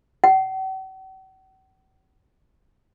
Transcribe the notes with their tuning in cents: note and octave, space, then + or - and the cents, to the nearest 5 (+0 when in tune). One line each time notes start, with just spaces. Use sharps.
F#5 +45